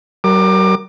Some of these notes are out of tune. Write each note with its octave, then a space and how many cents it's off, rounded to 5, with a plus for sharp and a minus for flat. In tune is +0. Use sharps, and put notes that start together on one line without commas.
F#3 +45 A#4 +0 D6 +25